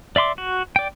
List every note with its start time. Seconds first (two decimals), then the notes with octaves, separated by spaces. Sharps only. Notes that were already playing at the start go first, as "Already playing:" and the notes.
0.16 D5 E5 C6 D6
0.38 F#4
0.76 D5 G5